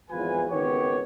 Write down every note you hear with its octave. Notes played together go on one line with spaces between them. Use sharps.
G#1 E2 F3 F4 B4 G#5
G#1 C#2 D#3 B3 G4 C#5